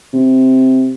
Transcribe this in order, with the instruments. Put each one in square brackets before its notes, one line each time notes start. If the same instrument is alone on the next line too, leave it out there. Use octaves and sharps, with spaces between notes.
[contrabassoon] C3